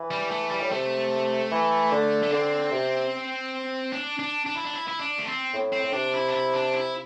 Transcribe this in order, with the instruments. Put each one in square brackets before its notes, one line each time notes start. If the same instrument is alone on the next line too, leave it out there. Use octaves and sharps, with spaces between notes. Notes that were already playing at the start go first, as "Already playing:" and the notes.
Already playing: [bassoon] E3
[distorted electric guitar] G3
A3
G3
[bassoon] A2
[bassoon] C3 [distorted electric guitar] A3
[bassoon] E3
D3
[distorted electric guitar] A3
[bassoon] D3 [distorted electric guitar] C4
[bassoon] C3
[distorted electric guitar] D4
D4
D4
E4
D4
E4
E4
D4
A3
C4
[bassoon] A2
[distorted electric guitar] C4
[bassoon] A2
[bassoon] C3 [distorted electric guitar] D4
[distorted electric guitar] E4
D4
E4
D4
E4